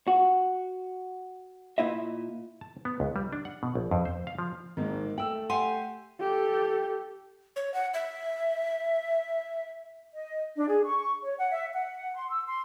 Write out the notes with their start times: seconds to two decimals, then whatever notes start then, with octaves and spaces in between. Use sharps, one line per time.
0.08 F#4
1.78 A#2 E4 D#5 E5
2.61 A5
2.85 B3
3.00 C#2
3.16 G3
3.33 D4
3.45 F#5
3.63 B2
3.75 A#1
3.91 F2
4.05 C5
4.27 F5
4.39 F3
4.77 G#1 G#2 D#3 A#3
5.18 A3 G5 E6 F#7
5.50 G4 F#5 G#5 C6
6.21 G4 A4
7.56 C#5
7.74 F#5
7.94 E5
10.13 D#5
10.56 D4
10.68 G#4
10.85 C#6
11.24 C#5
11.38 F#5
11.51 E5
11.73 F#5
12.15 C6
12.30 E6
12.46 C6